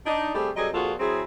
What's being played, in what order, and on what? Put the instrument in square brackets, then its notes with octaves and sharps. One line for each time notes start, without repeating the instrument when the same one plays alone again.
[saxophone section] D4 D#4
G3 A3 C4 G4 G#4
F#3 G3 C4 G#4 A4 D#5
F2 A#2 F4 F#4 G#4 A4
F#3 C4 E4 G#4